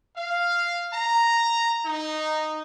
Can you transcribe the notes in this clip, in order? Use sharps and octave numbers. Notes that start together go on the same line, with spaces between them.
F5
A#5
D#4